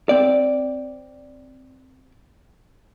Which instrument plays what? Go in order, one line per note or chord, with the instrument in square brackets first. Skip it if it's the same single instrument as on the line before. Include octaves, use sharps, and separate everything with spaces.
[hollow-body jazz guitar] C4 D5